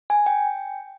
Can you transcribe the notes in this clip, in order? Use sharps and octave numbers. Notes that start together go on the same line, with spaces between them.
G#5
G5